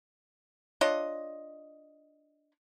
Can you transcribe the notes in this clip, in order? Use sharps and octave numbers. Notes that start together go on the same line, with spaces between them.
D4 F4 C#5 D#5